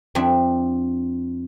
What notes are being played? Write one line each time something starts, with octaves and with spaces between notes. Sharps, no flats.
F2 C4 D4 E5